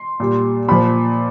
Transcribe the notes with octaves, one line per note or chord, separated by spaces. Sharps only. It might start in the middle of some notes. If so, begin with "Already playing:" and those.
Already playing: C6
A#2 G3
A#2 F3 B5